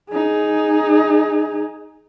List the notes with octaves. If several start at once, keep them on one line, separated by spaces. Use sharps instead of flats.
D#4 G#4